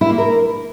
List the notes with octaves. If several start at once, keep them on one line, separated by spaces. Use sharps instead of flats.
E4
A#3
A#4